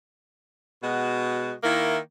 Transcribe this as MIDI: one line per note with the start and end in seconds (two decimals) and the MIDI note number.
0.83 1.54 47
0.83 1.54 56
0.83 1.54 66
1.63 1.97 51
1.63 1.97 58
1.63 1.97 64